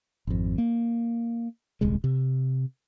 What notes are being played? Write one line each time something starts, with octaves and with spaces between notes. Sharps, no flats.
G#1 F2
A#3
D#1 C2 G#3
C3